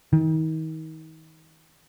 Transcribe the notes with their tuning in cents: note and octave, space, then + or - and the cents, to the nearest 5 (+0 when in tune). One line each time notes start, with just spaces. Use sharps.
D#3 +35